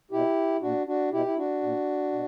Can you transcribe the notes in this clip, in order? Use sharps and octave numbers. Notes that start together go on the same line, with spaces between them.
B2 E4 G4
A#2 D4 F#4
D4 F#4
B2 E4 G4
E4
D4 F#4
A#2
B2